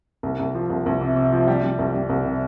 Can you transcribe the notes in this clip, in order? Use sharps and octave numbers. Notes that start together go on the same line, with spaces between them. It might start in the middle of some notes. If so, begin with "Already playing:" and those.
C2
C2
F3
C2
C2
C3
C3
F3
G3
G3
C2
G3
C2
C3